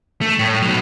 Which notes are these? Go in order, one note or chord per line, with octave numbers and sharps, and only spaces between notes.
A3
A2
B2 F#3